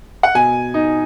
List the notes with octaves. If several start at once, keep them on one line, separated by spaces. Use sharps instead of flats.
F#5
B2 G#5
D#4